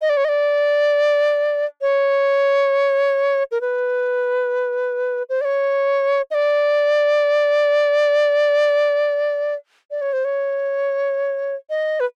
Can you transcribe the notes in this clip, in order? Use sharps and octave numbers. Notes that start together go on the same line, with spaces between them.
D#5
D5
C#5
D#5
D5
C#5
A#4
B4
C5
D5
C#5
D#5
D5
D5
C#5
C5
C#5
D#5
B4